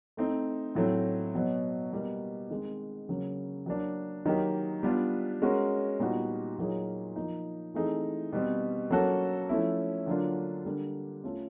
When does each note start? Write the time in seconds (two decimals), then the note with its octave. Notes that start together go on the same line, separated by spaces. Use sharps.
0.17 A3 C4 D#4
0.75 A2 F#3 A3 C4
1.34 B2 F#3 B3
1.92 B2 G3 A#3
2.50 D#3 G#3 C4
3.09 C#3 F#3 A#3
3.66 F#3 A#3 D4
4.26 D#3 F#3 A#3 D#4 G4
4.83 G3 B3 D4 F4
5.42 G#3 C#4 F#4 A#4
5.99 A#2 G3 B3 D#4 F#4
6.58 A#2 F#3 A#3 D#4 G#4
7.16 F3 A#3 D#4
7.74 E3 A3 C4 D#4 G#4
8.33 B2 G3 C4
8.91 F#3 A#3 C#4 F#4 A4
9.49 F3 A3 C#4 E4
10.06 D3 F#3 A#3 D4 F4
10.65 D3 G3 A#3
11.24 A3 C#4 F4 A4